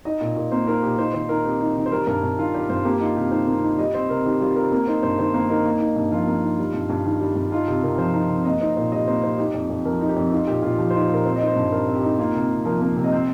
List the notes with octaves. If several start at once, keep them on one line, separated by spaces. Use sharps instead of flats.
D#4 D#5
A#2
A#2
A#3 C5
D#4 A#4
A#2 G4
D#4 C5
D#3 C5
D#3 A#4
C4 G4
D#4
D#3
C5
G3 A#4
G2 A#4
G2
D#3 F4
G3 G4
G2 C5
A#3 G4
D#4 F4
C3 G4
D#3 C5
A#3
D#4
G3 D#5
C4 C5
C3 A#4
D#3 G4
G3 F4
C4 A#4
A#3 A#4
D#4 C5
G2 C5
D#3 C5
A#3 C5
D#4 A#4
A#3
D#4
G2
F3 F4
A#3
D#4
G3
G2
G2
D#3
G3
G2
D#4 F4
C3 G4
C3 A#4
F3 C5
D#4
C3
A#3 D#5
D#4 C5
A#2 C5
G3 D#5
A#3 C5
D#4 C5
D#4 G4
F2
F2
F3 A#4
D#4
G4
F2
D#4 F4
A#2 G4
A#2 F4
F3 G4
C5
D#4
C5
A#2 A#4
C4 C5
D#5
D#4
C5
G2
G3 A#4
C4
G4
D#4
A#3 F4
C3
C3
F3 A#4
A#3
C3
D#5
C4 C5